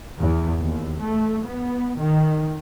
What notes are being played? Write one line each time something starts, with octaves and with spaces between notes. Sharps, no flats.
E2
D#2
A3
B3
D#3